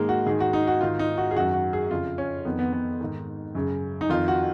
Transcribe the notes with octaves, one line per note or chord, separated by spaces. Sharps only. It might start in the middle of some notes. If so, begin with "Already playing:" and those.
Already playing: G#2 D#3 G#3 A#3
F#4
G#2 D#3 G#4
F#4
D#4
F#4
G#2 D#3 F4
D#4
F#4
G#4
F#2 D#3 F#4
F#4
G#4
F2 C#3 F4
C#4
F2 D#3 B3
B3
B3
G#2 D#3
F#2 C#3
D#4
F2 D#3 F4
F#4